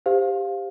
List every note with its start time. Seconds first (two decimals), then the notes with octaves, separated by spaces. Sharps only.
0.06 G4 C5 F5